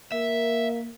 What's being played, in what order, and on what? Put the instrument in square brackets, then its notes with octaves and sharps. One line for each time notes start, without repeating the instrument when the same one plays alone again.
[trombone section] A#3 [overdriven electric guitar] E5